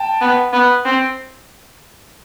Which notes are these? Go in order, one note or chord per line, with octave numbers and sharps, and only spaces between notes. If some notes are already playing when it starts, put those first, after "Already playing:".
Already playing: G5 A5
B3
B3
C4